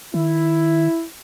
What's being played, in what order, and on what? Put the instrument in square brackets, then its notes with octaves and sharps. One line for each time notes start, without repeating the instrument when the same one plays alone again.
[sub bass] D#3 [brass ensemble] E4